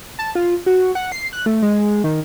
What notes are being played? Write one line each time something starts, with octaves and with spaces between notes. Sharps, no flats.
A5
F4
F#4
F#5
C7
F#6
A3
G#3
D#3